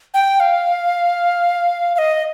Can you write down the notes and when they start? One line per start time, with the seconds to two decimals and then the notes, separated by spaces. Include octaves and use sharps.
0.14 G5
0.40 F5
1.95 F5
1.98 D#5